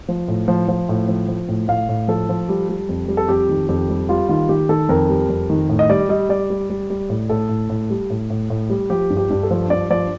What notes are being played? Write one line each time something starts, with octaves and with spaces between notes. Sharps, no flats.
F3
A2
F3
F3
A2
F3
F3
A2
A2 F5
A2
F3 A4
F3
G3
G3
F2
G3
A4
F2 G4
D#3
F2 G4
G3
G3 F4
D#3 F4
D#3 G4
D#3 A4
F2 A#4
G3
F2
D#3
A2
D#5
G3 D5
G3 D#5
G3 D5
G3
G3
G3
A2
A2 A4
A2
A2
G3
A2
A2
A2
G3
F3 G4
G2
G4
G2
A4
F3
G2 D5
F3 D5